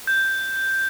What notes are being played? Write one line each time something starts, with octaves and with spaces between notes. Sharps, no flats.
G6